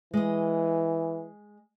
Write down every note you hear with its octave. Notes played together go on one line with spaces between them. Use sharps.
E3 G#3 D#5